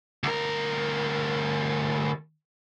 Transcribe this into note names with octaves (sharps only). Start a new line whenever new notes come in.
D2 A#4